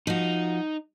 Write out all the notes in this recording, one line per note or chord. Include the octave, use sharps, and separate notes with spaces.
F3 D#4 F#4